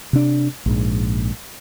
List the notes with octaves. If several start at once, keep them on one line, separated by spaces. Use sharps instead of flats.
C3 D4
A#1 G#2